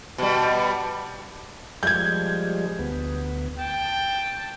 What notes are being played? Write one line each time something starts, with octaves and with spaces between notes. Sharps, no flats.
B2 G3
F3 G3 G#3 G6 G#6
D2 B3
G5 A5